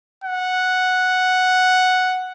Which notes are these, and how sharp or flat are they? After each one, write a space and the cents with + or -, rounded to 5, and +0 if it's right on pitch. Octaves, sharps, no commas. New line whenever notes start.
F#5 -5